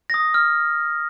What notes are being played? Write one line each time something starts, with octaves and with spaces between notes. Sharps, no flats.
D#6 A#6
F6